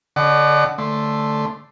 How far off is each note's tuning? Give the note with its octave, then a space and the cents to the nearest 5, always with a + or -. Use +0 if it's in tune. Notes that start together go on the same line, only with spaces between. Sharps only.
D3 -30 D#5 -45 F#5 +20
D3 +0 A3 +0 C6 +0